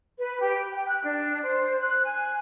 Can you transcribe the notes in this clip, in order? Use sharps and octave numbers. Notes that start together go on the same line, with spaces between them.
B4
G4
G5
F#6
D4
C5
F#6
G#5